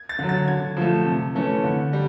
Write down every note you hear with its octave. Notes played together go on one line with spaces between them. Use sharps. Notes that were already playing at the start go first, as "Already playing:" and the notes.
Already playing: G#6
A6
D3 F#3
A6
D3 G#6
F3 A3
C3
E3 A3 C#4
D3
G3